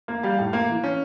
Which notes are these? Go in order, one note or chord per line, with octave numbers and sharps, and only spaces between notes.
A#3
G3 F5
A2
A#3
E3
C#4